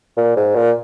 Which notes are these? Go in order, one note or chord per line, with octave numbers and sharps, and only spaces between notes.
A#2
G#2
A#2